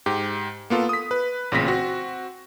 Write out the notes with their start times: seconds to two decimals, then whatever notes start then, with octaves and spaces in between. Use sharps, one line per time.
0.06 G#2 G4
0.70 A#3 B3 F4 A4
0.89 D#6 B6
1.11 B4
1.52 A1 A#2 C#3 C4 A#6 B6
1.66 C4 F#4